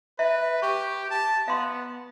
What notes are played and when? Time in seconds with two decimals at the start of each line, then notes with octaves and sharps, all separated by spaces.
0.19 B4 E5
0.62 G4 C#6
1.10 A5
1.48 B3 F5 C6